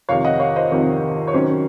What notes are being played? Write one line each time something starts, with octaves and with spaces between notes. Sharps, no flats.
F2 C3 D#3 C#5 F5
D#5 F#5
C#5 F5
C5 D#5
F2 C3 D#3
C#5
D#3 F#3 C#4 C5